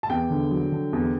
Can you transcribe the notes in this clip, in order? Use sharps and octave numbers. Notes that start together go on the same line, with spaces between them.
A5
E2 G5
D3
F#3
D3
E2